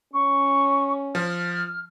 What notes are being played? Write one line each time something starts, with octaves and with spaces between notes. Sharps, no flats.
C#4 C#6
F3 F6